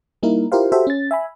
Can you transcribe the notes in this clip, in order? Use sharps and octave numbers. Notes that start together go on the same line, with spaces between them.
G3 A#3 D#4 E4 A#4
E4 F4 G4 A#4 C5 F5
F#4 G4 A4 C5 E5
C#4 A6
E5 G#5 B5